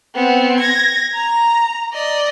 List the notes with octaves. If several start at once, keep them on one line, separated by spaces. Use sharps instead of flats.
B3 C4
G#6 A#6
A#5
D5 D#5